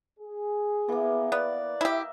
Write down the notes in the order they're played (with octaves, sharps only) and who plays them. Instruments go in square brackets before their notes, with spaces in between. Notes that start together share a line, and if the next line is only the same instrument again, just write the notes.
[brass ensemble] G#4
[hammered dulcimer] E3 A#3 [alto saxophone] B3
[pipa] B3 [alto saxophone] D5 [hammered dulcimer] F#5
[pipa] E4 G4 [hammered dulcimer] D#5 E5